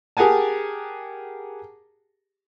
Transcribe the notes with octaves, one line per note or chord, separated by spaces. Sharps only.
G4 G#4 A#4 F#5 G#5 A5